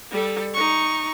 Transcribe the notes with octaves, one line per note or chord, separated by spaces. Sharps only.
G3 A4
D#4 C#6